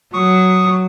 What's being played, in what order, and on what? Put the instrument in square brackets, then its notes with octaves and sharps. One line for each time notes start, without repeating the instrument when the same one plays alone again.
[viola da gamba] F#3 [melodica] C#6 D#6